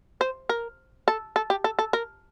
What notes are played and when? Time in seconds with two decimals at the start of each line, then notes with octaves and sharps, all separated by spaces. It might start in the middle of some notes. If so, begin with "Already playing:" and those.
0.21 C5
0.49 A#4
1.08 A4
1.36 A4
1.50 G4
1.64 A4
1.79 A4
1.93 A#4